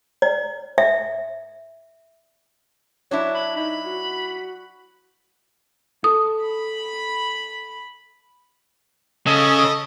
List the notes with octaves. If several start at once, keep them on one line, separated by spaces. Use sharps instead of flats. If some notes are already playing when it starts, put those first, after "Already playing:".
D5
E5
F#3 D4 E4 C#5
B5
D#4 B5
F#4
A4 D#6
B5
C#3 A4 D#5